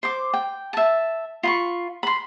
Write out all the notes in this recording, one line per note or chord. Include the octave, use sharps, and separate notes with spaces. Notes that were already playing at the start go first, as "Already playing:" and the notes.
C5 D6
G5
E5 A5
F4 B5 C#6
B5 C6